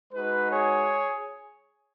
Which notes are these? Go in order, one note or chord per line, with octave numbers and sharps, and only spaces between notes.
G#3 D#4 F#4 B4
G#4 C#5